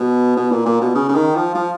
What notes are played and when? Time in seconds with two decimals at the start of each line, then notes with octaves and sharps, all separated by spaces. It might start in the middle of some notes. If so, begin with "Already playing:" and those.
Already playing: B2
0.36 B2
0.51 A#2
0.66 A#2
0.81 B2
0.95 C#3
1.08 C#3
1.15 D#3
1.35 F3
1.55 F3